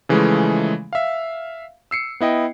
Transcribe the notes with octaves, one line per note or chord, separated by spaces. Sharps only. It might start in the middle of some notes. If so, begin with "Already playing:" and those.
C#3 E3 F3 G#3 A3
E5 F5
E6 C7 C#7
B3 E4 D#5 G5